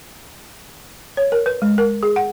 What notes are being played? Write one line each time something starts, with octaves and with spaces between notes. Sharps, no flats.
C#5
A#4
B4
G#3
A#4
G#4
F#5